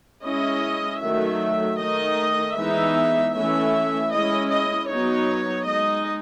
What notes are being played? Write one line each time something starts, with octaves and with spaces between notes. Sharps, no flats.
G#3 C#4 E4 D#5
D#3 F#3 A3 E5
D#3 A3 D#4 D#5
E3 G#3 B3 D#4 E5
E3 A3 C#4 E4 E5
G#3 C#4 E4 D#5
D#5
F#3 B3 D#4 C#5
G#3 D#4 D#5